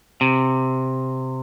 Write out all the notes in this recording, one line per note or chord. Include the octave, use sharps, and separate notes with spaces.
C3